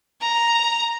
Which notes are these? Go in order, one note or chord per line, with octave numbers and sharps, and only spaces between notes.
A#5